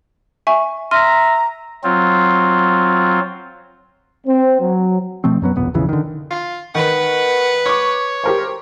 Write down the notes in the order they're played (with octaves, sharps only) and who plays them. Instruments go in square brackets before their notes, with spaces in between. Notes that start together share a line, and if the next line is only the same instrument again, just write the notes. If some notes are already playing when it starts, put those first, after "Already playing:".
[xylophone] E5 G#5 C#6
[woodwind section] E5 A#5 [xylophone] C6 F6 D#7
[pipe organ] F#3 C4 F4
[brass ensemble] C4
F#3
[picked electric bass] B2 F3 A3 C4
F#2 F#3 B3
E1 A#1 B3
B1 F2 C#3 E3
D3 D#3
[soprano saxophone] F4
[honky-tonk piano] D#3 [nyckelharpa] B4 [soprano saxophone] F#5
[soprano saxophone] C#5 [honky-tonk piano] C#6 D6
[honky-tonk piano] G4 A#4 C5